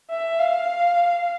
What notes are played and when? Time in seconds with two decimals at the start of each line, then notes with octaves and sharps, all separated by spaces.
0.10 E5
0.39 F5